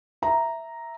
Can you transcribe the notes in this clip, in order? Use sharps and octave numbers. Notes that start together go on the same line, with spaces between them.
E5 A#5